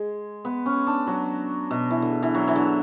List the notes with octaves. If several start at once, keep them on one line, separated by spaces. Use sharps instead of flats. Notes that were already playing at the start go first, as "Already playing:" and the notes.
Already playing: G#3
B3
C#4
D4
F#3
B2
E3
D3
E3
F#3
E3
D3